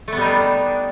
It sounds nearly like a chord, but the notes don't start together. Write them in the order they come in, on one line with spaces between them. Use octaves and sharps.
A3 B3 G3 D#4 D4